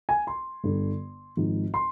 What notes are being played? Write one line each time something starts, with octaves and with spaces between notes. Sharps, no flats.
G#5
C6
G1 G2 D3
G#1 G#2 F3
C6